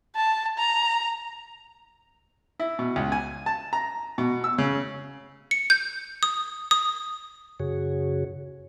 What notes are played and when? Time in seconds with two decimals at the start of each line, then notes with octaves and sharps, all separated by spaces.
0.16 A5
0.58 A#5
2.60 E4
2.79 B2
2.96 C#2
3.12 G#5
3.46 A5
3.73 A#5
4.18 B2
4.44 E6
4.58 C#3
5.51 C#7
5.70 G6
6.23 D#6
6.71 D#6
7.60 F#2 C#3 F#4 G#4 C#5